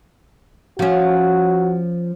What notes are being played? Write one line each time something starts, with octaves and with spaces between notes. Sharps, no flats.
F3 C#4 F#4